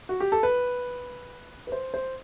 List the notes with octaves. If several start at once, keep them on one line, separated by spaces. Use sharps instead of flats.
F#4
G4
A4
B4
B4
C5
C5